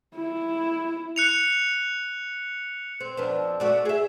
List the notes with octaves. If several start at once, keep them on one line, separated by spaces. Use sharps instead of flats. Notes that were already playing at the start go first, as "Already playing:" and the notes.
E4
F#6 C#7 F7
C4
F2 B3 D4
A3 F#4 D5
G#4 E5